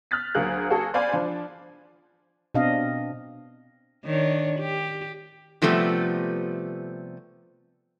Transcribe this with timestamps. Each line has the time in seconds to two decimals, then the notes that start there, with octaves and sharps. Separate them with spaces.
0.11 F6 F#6 A6 B6
0.34 D2 F#3 A#3 G#4 F#6
0.70 A#3 F#4 G#4 A4
0.94 C5 D5 F5 G#5 B5 C6
1.13 F3 D4
2.54 B2 C4 D4 D#5 F5
4.05 D#3 D4 C#5
4.59 G4
5.62 C3 F3 G3 A3 B3